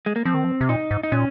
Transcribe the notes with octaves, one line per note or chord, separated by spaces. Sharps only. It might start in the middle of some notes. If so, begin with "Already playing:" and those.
G#3
A#3
F3 C4
D#3
F3
C3
A#2 D#4
G#2
D#4
A#2 C#4